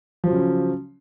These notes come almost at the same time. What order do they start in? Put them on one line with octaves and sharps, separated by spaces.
F3 F#3 C#3 C#4